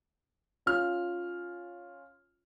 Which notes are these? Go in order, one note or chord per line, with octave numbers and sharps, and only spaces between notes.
C#4 F4 F6